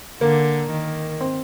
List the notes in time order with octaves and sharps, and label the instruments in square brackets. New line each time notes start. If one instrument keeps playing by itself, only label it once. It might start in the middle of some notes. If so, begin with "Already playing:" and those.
[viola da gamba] D3 [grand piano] A#3
[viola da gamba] D#3
[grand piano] C4